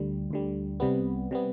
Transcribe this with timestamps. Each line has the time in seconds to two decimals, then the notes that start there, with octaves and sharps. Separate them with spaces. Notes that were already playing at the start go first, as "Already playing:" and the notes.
Already playing: D2 D3 G3
0.31 D2 D3 G3
0.80 C2 C3 G3 B3
1.31 C3 G3 B3